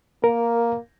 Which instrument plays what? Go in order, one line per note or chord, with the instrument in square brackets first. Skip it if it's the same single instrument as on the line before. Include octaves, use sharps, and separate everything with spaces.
[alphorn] A#3 [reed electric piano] A#4